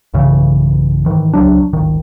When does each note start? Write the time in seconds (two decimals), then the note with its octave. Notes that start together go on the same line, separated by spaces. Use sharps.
0.14 B1 G2 C#3 E3
1.06 G#2 D#3 E3
1.33 C#2 F#3 D4
1.73 D1 G#1 D#3